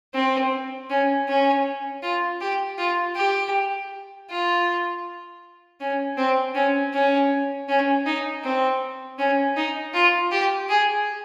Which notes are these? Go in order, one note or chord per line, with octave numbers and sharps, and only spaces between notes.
C4
C#4
C#4
F4
G4
F4
G4
F4
C#4
C4
C#4
C#4
C#4
D#4
C4
C#4
D#4
F4
G4
G#4